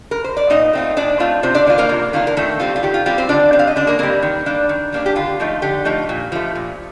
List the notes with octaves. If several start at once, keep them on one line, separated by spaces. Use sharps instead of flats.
A#4
C5
D5
A#2 D#4 D#5
A3 C4 F4
A#2 D4 D5
A3 C4 F4
C3 C4 C5
D4 D5
D#3 A#3 D4 F4
A#3 A#4
C3
D#3 A#3 D4 F4
A#4
D#3 A3 A4
G3 C4 F4
F4
D#3 G4
F4
G3 C4 F4 G4
C4 C5
D3 D4 D5
G3 C4
F5
D#5
D3 D4 D5
A#3 A#4
G3 A#3 C4 A#4
D#3
G3 A#3 D4
D#3
G3 A#3 D4
G4
D3 F4
F3 A3 D#4
D3 G4
F3 A3 D#4
A#2
F3 A3
A#2